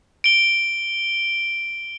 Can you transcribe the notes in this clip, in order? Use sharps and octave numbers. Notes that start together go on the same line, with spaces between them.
D7 G7